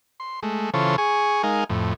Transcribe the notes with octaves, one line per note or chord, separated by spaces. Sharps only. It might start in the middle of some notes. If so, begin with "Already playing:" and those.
C6
G#3 A3
C#3 E3 F4 A4 C5 C#5
G#4 G#5 C#6
G#3 D#4 A#4 F5 G#5
F2 A2